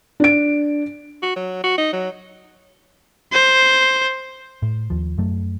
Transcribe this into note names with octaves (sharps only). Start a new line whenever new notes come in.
D4 D7
F#4
F#3
F#4
D#4
F#3
C5
A2
D#2 F3
F#2 F#3 A3